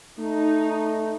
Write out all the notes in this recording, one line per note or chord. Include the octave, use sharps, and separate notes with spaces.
A3 D#4